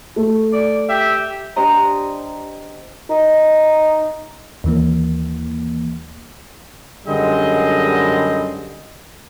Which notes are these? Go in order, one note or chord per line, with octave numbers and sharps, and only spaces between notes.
A3
D5
G4 E5
D4 G4 C5 D#5 A#5
D#4
D#2 E3 A#3
F#2 D3 G3 G#3 C4 D#5